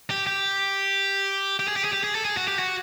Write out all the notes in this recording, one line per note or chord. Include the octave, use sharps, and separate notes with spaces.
G4
G4
G4
G#4
G4
G#4
G4
G#4
A4
G#4
F#4
G4
F#4